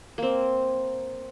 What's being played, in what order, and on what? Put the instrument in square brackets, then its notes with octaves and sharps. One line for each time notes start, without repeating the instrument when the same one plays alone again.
[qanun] A#3 C4